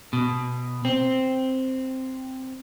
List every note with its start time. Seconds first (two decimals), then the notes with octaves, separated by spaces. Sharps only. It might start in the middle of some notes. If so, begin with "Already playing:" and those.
0.13 B2
0.85 C4